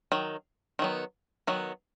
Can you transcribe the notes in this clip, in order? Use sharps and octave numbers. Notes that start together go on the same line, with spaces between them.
D#3 F#3
D#3 F#3 B3
D#3 F#3 B3